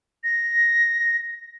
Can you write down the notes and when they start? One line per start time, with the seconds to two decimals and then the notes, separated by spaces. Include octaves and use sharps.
0.24 A#6